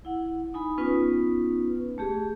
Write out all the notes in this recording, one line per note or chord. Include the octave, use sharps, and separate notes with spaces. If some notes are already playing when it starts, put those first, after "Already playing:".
E4 F#5
D#4 G#5 B5
B3 C#4 D#4 F4 B4
A3 G4 G#4